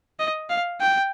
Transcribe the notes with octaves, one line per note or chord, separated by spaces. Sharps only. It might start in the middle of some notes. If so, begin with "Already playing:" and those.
D#5
F5
G5